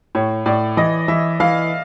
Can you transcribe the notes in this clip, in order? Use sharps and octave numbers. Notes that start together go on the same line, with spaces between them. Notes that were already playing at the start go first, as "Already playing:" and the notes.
A2 C#5
A2 D5
E3 D#5
E3 E5
E3 F5